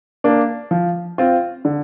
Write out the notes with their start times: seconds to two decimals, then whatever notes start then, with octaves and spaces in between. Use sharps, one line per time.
0.24 A#3 D4
0.71 F3
1.18 C4 F4
1.65 D3